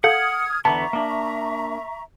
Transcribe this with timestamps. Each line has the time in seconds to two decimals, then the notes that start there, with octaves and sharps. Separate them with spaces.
0.04 A4 F5 F#5 D#6 F6 G6 G#6
0.65 E2 D3 B3 E5 A5 A#5 C#6
0.93 A#3 D4